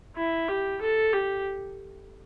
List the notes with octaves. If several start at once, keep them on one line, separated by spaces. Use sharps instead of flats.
E4
G4
A4
G4